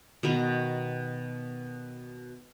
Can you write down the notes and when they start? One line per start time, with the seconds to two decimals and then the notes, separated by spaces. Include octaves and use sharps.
0.23 B2 D#3 B3 A#5